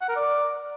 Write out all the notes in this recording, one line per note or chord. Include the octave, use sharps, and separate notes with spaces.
F#5
A#4
D5